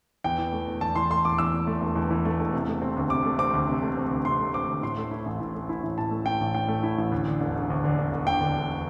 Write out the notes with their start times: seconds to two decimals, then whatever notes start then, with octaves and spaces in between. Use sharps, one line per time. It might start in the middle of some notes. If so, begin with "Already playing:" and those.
0.24 E2 G5
0.38 E3
0.53 A3
0.67 E1
0.81 E2 A5
0.95 E3 C6
1.10 A3 C6
1.24 E1 D6
1.38 E2 E6
1.53 E3
1.67 A3
1.81 E1
1.96 E2
2.11 E3
2.25 A3
2.39 E1
2.53 C3
2.67 A3
2.82 C4
2.96 D2
3.10 C3 D6
3.25 A3
3.39 C4 D6
3.54 D2
3.67 C3
3.82 A3
3.97 C4
4.11 D2
4.25 C3 C6
4.40 A3
4.54 C4 D6
4.68 D2
4.82 A2 C6
4.97 A3
5.11 E4
5.25 A1
5.40 A2
5.55 A3
5.69 E4
5.83 A1
5.97 A2 A5
6.11 A3
6.26 E4 G5
6.41 A1
6.54 A2 G5
6.68 A3
6.83 E4
6.98 A1
7.12 D2
7.26 D3
7.40 E1
7.56 E1
7.70 D2
7.84 D3
7.98 E1
8.12 E1
8.26 D2 G5
8.41 D3
8.55 E1